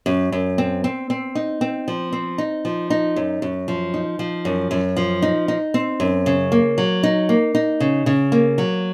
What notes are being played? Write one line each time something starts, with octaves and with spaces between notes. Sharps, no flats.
F#2
F#2
C4
C4
C4
D#4
C4
F3
C4
D#4
F3
D#4
F#2
F#2
F3
D#4
F3
F#2
F#2
F3
D#4
D#4
C4
F#2
C#3
A#3
F#3
D#4
A#3
D#4
C#3
C#3
A#3
F#3